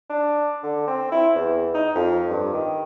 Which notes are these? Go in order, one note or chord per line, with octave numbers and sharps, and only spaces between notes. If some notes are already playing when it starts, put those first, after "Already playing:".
D4
D3
C4
E4
E2
D#4
F2
G2
D#3